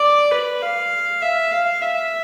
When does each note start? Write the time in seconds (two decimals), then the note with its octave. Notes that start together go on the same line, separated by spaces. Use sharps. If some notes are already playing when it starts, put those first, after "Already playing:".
Already playing: D5
0.31 B4
0.62 F5
1.22 E5
1.51 F5
1.82 E5